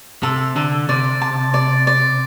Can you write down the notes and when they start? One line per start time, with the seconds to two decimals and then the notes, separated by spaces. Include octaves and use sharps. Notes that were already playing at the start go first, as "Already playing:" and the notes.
0.23 C3 A4
0.56 D3 A4
0.89 C3 D5
1.21 A5
1.54 D5
1.87 D5